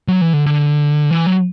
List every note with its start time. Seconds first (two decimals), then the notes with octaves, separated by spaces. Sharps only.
0.08 F#3
0.21 E3
0.33 D3
0.46 D3
1.10 E3
1.27 F#3